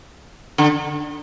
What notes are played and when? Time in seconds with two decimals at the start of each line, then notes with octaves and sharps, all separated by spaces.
0.58 D3